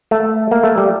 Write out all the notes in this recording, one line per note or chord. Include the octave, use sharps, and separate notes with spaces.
A3
A#3
A3
G3